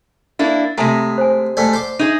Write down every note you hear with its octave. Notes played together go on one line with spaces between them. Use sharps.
A#3 D4 E4
A2 C3 G#3 E5 G#5 A#5
C5 G#5
G#2 A3 D5 G#5
C5 D6
D#4 G#4 E5